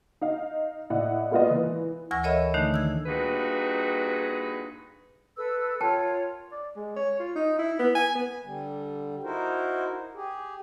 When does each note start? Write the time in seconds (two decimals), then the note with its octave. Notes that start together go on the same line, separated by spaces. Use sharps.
0.21 D#4 F5
0.90 A2 E4 D5 D#5 F#5
1.31 G#3 A#3 B3 F4 D5 D#5
1.50 E3
2.11 D2 E3 G#5 C#6 E6 A#6
2.23 A4 A#4 C#5 D#5 E5 B5
2.54 D3 D#3 A3 D4 D#4
2.74 E6 G#6
3.06 G2 A#2 D#4 F#4 G#4 B4
5.37 A4 B4 E6
5.81 F4 A#4 C#5 G5 A5
6.51 D5
6.76 G#3
6.96 C#5
7.19 F4
7.35 D#4
7.58 E4
7.79 B3
7.95 G#5
8.15 B3
8.41 D3 G3
9.23 D#4 E4 F#4 A#4 C5
10.14 G4 G#4